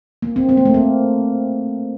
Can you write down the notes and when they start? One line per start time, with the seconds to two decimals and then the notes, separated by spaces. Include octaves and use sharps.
0.22 A#3
0.36 C4
0.49 C4
0.57 A#3
0.65 A3
0.74 A#3